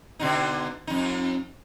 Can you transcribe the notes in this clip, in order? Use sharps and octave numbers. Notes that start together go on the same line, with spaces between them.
B2 D3 D#4
F2 D#4